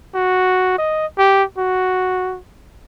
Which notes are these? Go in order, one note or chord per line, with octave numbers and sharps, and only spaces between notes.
F#4
D#5
G4
F#4